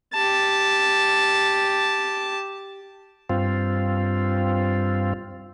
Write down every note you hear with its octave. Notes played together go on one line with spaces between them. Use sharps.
G4 A5
G2 C4 F4